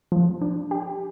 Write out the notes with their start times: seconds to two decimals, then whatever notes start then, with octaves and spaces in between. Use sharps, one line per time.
0.12 F3
0.41 D4
0.71 G4